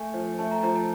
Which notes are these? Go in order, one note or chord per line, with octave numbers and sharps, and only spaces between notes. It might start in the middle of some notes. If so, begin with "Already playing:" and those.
Already playing: A3 G#5
F3
A3 A5
A#5
A5
F3 A#5
A5